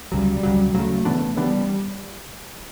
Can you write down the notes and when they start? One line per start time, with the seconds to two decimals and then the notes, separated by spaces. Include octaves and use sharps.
0.12 D2 C#3 F#3 G3
0.43 D2 C#3 F#3
0.74 D2 C#3 F#3 A3
1.05 C#3 E3 B3 D4
1.36 C#3 E3 G3 B3 D4